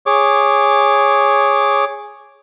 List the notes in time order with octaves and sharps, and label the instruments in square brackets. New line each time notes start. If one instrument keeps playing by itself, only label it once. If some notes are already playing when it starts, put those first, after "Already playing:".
[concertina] G#4 C#5 D6